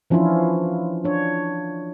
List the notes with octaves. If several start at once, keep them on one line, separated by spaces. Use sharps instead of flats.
E3 F3 C#4 D4 E4 F4
D4 C#5